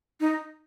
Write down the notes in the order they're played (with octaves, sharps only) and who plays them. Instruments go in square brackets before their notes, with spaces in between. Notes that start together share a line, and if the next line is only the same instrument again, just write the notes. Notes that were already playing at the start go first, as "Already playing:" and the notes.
[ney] D#4